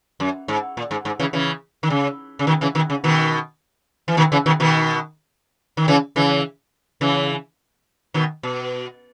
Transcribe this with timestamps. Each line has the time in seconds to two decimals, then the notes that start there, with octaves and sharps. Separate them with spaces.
0.20 F#2
0.48 G#2
0.77 A#2
0.91 G#2
1.05 G#2
1.20 C#3 E3
1.33 C#3 E3
1.83 D#3
1.90 C#3
2.39 C#3
2.47 B2 D#3
2.61 C#3 E3
2.75 B2 D#3
2.90 C#3
3.04 B2 D#3
4.08 E3
4.17 B2 D#3
4.32 C#3 E3
4.46 B2 D#3
4.60 B2 D#3
5.77 D#3
5.88 C#3 E3
6.16 C#3 E3
7.01 C#3 E3
8.14 B2 D#3
8.43 B2